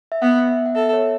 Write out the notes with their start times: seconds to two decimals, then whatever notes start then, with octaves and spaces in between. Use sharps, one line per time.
0.12 E5
0.21 B3 F#5
0.48 E5
0.66 F#5
0.75 A4 E5
0.93 C#5